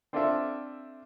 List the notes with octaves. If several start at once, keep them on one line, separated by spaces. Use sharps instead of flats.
C4 D4 F4 A4 D5 E5